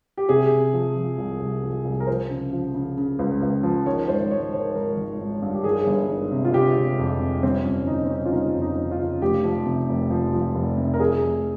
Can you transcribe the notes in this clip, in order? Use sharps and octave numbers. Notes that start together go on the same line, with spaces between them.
G4
C3 G#4
C3
F3
F3
C2
C2
F3
C2
A#4
F3 C5
C#3
F3
C#3
C#3
C#2
C#2
F3
D#3 C#5
G#1 C5
G#1 C#5
D#3 C5
C5
G#1 A#4
G#1
G#1
G2
G4
D#3 G#4
G1
D#3
C3
F4
C3 G4
C3
F2
C3
G1 C4
G1 C#4
G1 D#4
C4
C#3 C#4
F4
G1 D#4
F2
D#4
F3
F4
C#3
F1 G4
F3
C3
F1
F3
F3
F1
C3
A#4
F2 G#4
F1